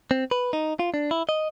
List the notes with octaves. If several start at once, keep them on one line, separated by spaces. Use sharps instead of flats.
C4
B4
D#4
F4
D4
E4
D#5